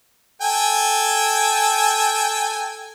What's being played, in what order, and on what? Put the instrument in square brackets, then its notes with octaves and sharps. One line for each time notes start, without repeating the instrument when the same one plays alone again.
[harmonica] A4 G5 G#5